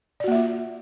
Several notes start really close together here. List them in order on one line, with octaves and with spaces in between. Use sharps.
D5 F#4 A#3 E5 F4